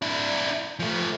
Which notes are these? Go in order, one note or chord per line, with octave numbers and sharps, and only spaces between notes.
D4 E4
F3 A3